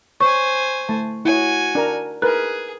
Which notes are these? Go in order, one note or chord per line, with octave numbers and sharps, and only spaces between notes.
C5 C#5 G#5 C#6
A3 A5
E4 F#4 C#5 G#5
D4 A#4 A#5
G#4 A#4 B4 F#6